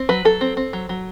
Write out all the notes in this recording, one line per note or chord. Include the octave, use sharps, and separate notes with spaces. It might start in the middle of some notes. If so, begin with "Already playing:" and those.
Already playing: C4
F#3 B4
F#3 A4
C4
C4
F#3
F#3